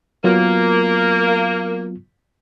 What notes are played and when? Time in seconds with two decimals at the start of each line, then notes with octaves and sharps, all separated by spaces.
0.24 F#3 A#3 B3 F4